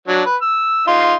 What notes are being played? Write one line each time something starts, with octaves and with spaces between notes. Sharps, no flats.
F#3 D4
B4
E6
D#4 F4 C6